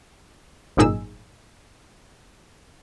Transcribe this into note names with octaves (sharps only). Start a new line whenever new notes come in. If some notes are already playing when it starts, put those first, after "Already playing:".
G#1 F#2 A#2 D#4 G#4 E6